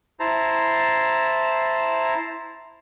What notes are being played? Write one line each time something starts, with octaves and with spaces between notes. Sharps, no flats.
E4 C5 A5 A#5